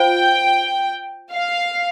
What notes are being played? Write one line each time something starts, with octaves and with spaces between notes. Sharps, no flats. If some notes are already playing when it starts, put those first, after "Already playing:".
Already playing: F4 C5 F5 G5
F5